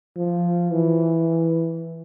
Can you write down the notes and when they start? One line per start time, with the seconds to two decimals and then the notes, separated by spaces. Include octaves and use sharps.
0.17 F3
0.71 E3